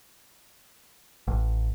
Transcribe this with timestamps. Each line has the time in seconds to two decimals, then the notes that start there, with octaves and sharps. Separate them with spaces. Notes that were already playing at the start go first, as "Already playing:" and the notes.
1.28 A1